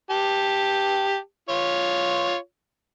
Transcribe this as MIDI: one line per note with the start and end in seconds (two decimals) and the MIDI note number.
0.11 1.17 67
0.11 1.17 81
1.49 2.35 65
1.49 2.35 73